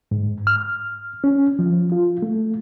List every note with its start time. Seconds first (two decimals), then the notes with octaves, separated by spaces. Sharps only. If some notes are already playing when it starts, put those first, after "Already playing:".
0.11 G#2
0.47 F6
1.24 C#4
1.59 F3
1.92 F4
2.22 A3